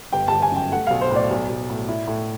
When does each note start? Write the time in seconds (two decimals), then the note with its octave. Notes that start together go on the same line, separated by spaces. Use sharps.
0.12 G1 G5
0.28 G1 A5
0.42 G#5
0.52 F#2 G5
0.72 A3 F#5
0.87 B1 F5
1.01 C5
1.11 A2 D5
1.31 B1
1.49 B1
1.70 A2
1.89 E4
2.08 A2